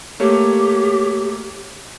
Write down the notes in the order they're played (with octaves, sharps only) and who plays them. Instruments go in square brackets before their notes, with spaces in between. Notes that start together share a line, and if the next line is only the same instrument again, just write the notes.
[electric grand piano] A3 A#3 C#5 [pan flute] G4